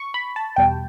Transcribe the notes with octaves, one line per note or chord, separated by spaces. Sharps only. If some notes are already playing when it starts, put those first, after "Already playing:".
Already playing: C#6
B5
A5
E2 B2 G3 G5